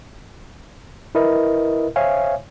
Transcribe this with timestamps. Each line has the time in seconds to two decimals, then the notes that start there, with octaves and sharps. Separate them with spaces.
1.15 E4 A#4 B4 D#5 E5
1.96 C5 C#5 E5 F5 G#5